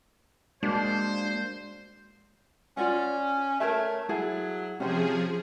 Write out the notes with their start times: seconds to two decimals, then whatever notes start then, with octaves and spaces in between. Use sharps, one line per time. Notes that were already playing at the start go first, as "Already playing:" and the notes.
0.63 G#3 A#3 D4 F#4 C5
2.77 C#4 F4 D5 F#5
3.60 A3 A#4 C#5 E5
4.09 F#3 E4 G#4 A4
4.80 C3 F3 C#4 G#4 C5